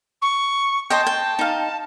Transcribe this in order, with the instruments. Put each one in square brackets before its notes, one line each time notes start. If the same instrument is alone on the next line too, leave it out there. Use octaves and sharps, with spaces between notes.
[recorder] C#6
[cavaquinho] C5 D#5 G5 [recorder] A5
[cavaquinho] G5
D#4 F5